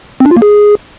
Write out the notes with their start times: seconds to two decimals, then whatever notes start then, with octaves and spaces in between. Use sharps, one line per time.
0.20 C4
0.26 D4
0.31 F4
0.37 A#3
0.42 G#4